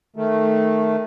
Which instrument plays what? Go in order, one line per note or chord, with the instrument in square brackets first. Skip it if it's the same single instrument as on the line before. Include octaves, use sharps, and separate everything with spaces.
[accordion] D#3 A3